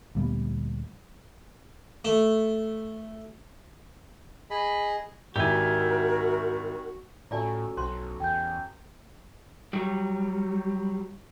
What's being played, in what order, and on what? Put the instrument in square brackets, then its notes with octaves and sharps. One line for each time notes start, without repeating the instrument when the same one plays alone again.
[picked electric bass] D2 A#2 G3 B3
[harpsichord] A3
[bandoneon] G#4 D#5 [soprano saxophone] B5
[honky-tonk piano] G#1 E4 [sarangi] F#4 [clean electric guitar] G4 G#5 [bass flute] A#4
[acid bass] A2 [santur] F#3 C#4 A4 [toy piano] F4 D5 G#5
[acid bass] B1 [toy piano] C#4 C5 C6 [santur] F#4
[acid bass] E2 [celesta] G5 G6 [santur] G#5
[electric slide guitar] F#3 G3